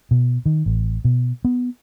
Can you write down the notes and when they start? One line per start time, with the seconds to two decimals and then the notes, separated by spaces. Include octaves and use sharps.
0.11 B2
0.46 D#3
0.66 A1
1.05 B2
1.45 B3